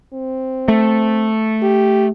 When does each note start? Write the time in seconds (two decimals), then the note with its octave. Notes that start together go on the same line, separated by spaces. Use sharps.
0.13 C4
0.68 A3
1.62 G4